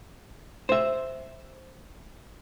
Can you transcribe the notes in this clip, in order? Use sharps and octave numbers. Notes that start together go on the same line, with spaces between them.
C5 E5